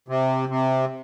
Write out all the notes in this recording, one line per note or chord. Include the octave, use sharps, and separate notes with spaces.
C3
C3